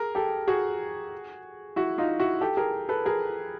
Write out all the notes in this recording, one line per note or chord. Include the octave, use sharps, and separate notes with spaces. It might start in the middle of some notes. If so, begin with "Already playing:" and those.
Already playing: G#4 A#4
G4 A4
F#4 G#4
E4 F#4
D#4 F4
E4 F#4
G4 A4
G#4 A#4
A4 B4
G#4 A#4